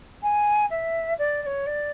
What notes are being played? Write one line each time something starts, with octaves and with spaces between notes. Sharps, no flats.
G#5
E5
D5
D5
C#5
D5